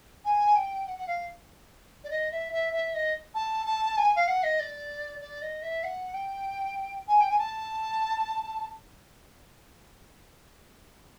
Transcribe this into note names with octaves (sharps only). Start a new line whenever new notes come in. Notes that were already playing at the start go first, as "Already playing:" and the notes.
G#5
G5
F#5
F#5
F5
D5
D#5
E5
E5
E5
D#5
A5
A5
G#5
F5
F#5
D#5
D5
D5
D#5
E5
F#5
G5
G#5
G5
G#5
A5